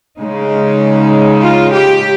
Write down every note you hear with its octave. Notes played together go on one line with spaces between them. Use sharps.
C#3 G#3 D#4
F4
G4